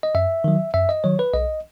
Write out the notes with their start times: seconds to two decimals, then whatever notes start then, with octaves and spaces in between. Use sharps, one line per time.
0.03 D#5
0.15 F#2 E5
0.44 D#3 F#3
0.74 F#2 E5
0.89 D#5
1.04 D#3 F#3 C#5
1.19 B4
1.34 B1 D#5